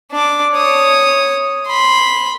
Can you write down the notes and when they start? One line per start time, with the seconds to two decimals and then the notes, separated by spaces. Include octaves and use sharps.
0.12 D4 D6
0.54 C#5 D#6
1.67 B5 C6